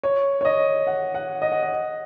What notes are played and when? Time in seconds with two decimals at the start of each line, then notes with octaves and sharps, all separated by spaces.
0.03 C#5
0.41 C#5
0.45 D#5
0.87 F#5
1.14 F#5
1.42 D#5
1.52 F#5
1.62 D#5